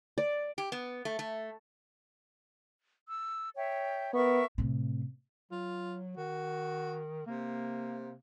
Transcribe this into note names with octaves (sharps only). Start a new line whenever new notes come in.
D5
G4
B3
A3
A3
E6
C#5 E5 G5
B3 A#4 E5 C#6
A2 C3
F#3 F4
D#3 F#4
C3 A#3